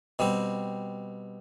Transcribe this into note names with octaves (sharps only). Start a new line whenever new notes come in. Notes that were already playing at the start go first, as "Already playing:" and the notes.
B2 G3 C4